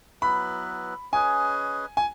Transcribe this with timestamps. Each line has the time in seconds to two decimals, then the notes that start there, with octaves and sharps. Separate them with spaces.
0.22 F#3 B3 E4 B4 B5
1.12 C#4 G#4 B4 D#5 G#5
1.97 G#5